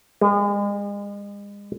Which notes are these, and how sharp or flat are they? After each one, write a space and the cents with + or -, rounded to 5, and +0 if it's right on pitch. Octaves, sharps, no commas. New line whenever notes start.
G#3 -40